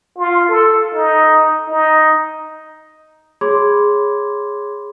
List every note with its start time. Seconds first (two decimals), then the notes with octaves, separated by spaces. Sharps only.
0.18 F4
0.49 A4
0.94 D#4
1.68 D#4
3.41 G#4 C#5 B5 C6 D6 G#6